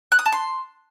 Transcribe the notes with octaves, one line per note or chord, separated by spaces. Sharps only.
F#6
D#6
A5
C6